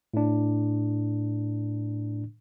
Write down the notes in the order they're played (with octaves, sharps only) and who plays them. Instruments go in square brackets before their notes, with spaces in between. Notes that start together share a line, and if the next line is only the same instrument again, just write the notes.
[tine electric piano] A2 D4